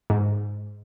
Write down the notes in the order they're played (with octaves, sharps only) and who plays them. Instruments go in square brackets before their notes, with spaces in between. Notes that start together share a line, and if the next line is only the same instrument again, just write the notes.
[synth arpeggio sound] G#2